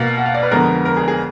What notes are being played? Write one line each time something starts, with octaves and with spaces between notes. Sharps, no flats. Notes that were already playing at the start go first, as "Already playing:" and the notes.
Already playing: B2 A#3 F5
F#5
F5
D5
B4
F2 D3 G#3 B3 A#4
A#4
G#4
G#4